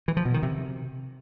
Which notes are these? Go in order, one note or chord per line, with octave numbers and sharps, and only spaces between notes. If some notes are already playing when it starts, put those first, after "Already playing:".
E3
F3
B2
D#3
C3